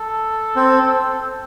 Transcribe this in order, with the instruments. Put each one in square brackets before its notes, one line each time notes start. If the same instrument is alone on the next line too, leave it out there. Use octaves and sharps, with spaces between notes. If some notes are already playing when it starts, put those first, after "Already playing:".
Already playing: [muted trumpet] A4
[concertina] C4